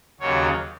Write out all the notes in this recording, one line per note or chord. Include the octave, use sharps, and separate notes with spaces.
D#2 C#3 F#3 C#5